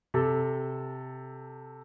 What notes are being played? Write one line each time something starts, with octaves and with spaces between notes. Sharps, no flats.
C3 A4